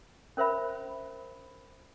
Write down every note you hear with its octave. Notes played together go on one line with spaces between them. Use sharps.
C#4 A#4 C5 E5 B5